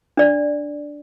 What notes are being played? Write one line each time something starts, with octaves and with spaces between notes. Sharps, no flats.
D4 D5